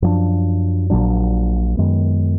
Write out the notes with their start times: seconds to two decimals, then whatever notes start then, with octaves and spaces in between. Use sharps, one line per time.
0.02 F#2 F3 B3 D4
0.90 A#1 A#2 F#3 D4
1.77 F#2 D#3 G#3 B3